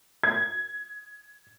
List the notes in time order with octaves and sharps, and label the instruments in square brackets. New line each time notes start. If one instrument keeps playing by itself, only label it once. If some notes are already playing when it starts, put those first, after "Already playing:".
[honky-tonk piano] G#6